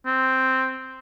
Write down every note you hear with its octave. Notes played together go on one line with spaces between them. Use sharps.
C4